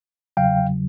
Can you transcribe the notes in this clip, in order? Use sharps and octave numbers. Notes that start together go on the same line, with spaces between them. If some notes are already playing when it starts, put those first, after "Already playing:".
E2 C#3 F#3 F5 G5